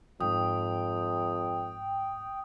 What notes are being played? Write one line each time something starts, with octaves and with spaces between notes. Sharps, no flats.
F2 G#2 G5 D#6